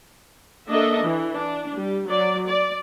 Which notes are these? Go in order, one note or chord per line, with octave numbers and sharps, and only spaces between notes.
A#3 D4 A4 D#5 E5
E3
D4
G3
F#3 D5
D5